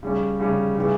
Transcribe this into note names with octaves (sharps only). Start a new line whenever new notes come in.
C#3 G3 C#4
C#3 G3 C#4
C#3 E3 G3